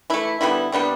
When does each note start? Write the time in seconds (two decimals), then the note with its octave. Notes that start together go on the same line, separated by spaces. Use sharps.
0.10 E3 A3 E4
0.41 D3 G3 B3 E4
0.72 C3 G3 B3 D4